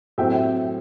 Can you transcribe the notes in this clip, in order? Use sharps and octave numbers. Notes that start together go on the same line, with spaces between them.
A2 F#3 A3 C4 E5 G5